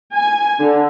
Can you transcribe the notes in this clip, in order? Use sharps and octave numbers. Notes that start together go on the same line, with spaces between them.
G#5
D3